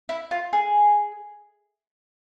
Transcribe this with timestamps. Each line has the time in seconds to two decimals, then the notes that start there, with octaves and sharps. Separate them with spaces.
0.09 E4
0.31 F4
0.53 G#4